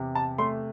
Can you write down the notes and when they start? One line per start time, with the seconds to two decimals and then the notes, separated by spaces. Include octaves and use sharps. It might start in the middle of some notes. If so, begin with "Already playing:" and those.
Already playing: E2 C3
0.15 A5
0.38 A3 C6